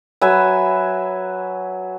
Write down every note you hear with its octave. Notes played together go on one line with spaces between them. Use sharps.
F#3 B4 E5 G#5